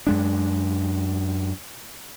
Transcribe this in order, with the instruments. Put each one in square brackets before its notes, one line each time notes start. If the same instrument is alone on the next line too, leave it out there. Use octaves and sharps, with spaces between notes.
[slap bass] F#2 G#3 D4